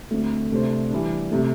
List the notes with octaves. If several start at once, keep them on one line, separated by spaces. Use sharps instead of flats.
D2 D3 A3 C4
C3 A3 D4 C5
E3 G3 D4
C3 A3